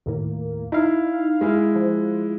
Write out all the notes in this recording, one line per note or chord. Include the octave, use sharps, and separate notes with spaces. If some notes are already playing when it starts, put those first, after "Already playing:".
D#2 A2 A#3
D#4 E4 F5
G#3 E4
F3